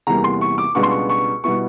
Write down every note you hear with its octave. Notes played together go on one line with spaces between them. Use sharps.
E2 C3 E3 G3 A#3 A#5
C6
C#6
D6
C#2 B2 G3 B3 D4 C#6
C6
C#6
C#6
B2 G3 B3 E4 C#6